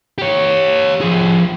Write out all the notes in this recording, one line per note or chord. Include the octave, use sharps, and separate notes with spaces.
G4 C#5
F3 G#4